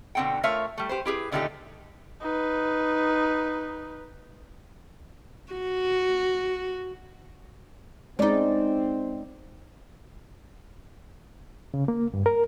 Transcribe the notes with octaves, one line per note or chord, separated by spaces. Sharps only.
B2 D3 C4 F#5 G5
A3 F4 A#4 C#5 E5 F5
G3 A3
G4 B4 C5
E4 G4 G#4 B4
A#2 D3 D#3 A3 D#4 G4
D#4 B4
F#4
G#3 C4 C#4 D#4 D5
C#3
A#3
G2
A#4